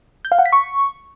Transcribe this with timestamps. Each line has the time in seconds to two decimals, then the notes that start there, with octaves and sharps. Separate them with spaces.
0.25 G6
0.32 F5
0.39 F#5
0.46 B6
0.53 C#6